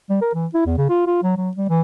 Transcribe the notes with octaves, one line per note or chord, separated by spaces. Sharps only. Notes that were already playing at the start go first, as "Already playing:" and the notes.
G3
A#4
E3
E4
E2
C#3
F4
F4
F#3
F#3
G3
E3